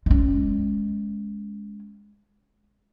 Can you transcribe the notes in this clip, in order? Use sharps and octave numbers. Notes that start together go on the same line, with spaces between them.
G#3 C#4